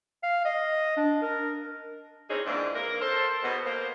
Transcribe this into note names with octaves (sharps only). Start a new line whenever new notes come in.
F5
D#5
D4
A#4
E3 C4 C#4 D#4 G#4
F2 G#2 E3 A#3 D4
A#3 A#4
A4 C5
G#2 B2 B3
A#3 C5